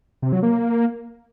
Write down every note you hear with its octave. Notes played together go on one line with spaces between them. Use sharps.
C3
F#3
A#3